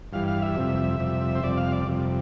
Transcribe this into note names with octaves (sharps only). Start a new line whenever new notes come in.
G2 E3 G3 F5
F5
E5
F2 C3 G3
F2 C3 G3
C5
F2 C3 G3 D5
F5
D5
F2 C3 G3